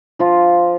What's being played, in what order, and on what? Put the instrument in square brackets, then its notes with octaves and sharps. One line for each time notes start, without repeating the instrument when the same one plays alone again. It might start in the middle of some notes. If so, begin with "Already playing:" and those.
[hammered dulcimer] F3 F4